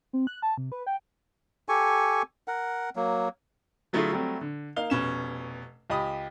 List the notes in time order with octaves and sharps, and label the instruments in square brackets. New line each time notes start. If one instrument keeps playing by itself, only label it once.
[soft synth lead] C4
F#6
A5
C3
B4
G5
[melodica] G4 A4 G#5 C#6
A#4 F#5
F#3 A#3
[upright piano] D3 F#3 A3 E4 F4 G#4
F#3 G3 A3 C4
D3
A#3 D#4 F5 G7
F1 B2 C#4 E7
C#2 G4 D#5 B5 D#6